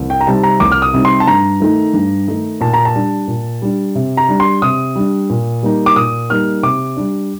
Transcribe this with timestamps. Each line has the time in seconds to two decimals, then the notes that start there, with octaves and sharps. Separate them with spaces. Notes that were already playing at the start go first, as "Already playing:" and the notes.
Already playing: C2
0.10 G5
0.21 A#5
0.27 C3 G3 C4 D#4 A5
0.43 A#5
0.60 C2 D6
0.72 F6
0.82 D#6
0.94 C3 G3 C4 D#4
1.05 C6
1.20 A5
1.27 G2 A#5
1.60 D#3 A3 D#4
1.94 G2
2.28 D#3 A3 D#4
2.61 A#2 A5
2.74 A#5
2.85 A5
2.95 G3 D4
3.28 A#2
3.62 G3 D4
3.95 C3
4.17 A#5
4.29 G3 D4
4.40 C6
4.62 C3 D#6
4.95 G3 D4
5.30 A#2
5.63 G3 A#3 D#4
5.86 D6
5.96 A#2 D#6
6.30 G3 A#3 D#4 F6
6.63 C3 D6
6.97 G3 D4